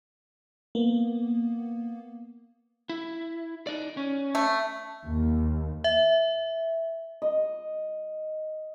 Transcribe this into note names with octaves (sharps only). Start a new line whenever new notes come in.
A#3 B3
E4
D#4 D5
C#4
A3
D#2
E5
D#5